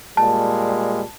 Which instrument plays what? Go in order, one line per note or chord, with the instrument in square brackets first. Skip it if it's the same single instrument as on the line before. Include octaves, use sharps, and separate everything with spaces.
[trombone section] A#2 G3 G#3 [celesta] A5